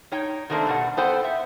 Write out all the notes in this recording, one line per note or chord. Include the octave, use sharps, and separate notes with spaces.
D#4 C#5 G5
D#3 A3 A#3 C4 D4
G2 B2 F#5
B3 A4 C5 F#5 G5
E5